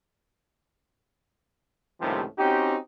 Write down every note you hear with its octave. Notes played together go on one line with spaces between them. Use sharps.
C#2 A2 C3 D#3 F3 G3
C4 C#4 D#4 F#4 G4